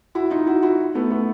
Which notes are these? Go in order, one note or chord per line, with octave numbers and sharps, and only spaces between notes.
E4 F#4
D#4 F4
E4 F#4
E4 F#4
A3 B3
A3 B3